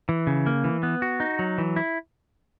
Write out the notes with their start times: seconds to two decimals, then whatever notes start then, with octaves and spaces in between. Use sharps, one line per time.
0.09 E3
0.27 C#3
0.46 A#3
0.64 E3
0.83 B3
1.02 F#4
1.20 D#4
1.39 F#3
1.58 E3
1.76 E4